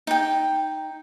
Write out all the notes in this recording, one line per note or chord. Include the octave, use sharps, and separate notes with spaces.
D#4 G5